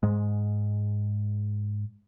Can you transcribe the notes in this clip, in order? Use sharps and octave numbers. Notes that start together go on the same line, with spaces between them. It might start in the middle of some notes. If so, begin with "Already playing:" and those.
G#2 G#3